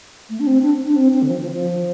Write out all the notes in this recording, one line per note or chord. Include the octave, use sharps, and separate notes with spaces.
A3
D4
C4
D4
D4
C4
C4
D3
F3
F3
F3